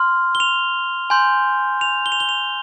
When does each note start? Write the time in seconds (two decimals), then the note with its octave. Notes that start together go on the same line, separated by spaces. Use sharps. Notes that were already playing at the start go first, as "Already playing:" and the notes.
Already playing: C6 F6
0.35 G7
0.40 F7
1.10 G#5 C6 G6
1.81 F7
2.06 G7
2.12 F7
2.20 G7
2.29 F7